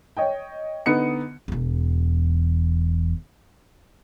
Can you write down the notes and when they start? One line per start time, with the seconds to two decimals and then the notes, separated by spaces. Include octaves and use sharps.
0.17 C#5 D#5 G5
0.86 D3 B3 D#4 C#7
1.48 E1 E2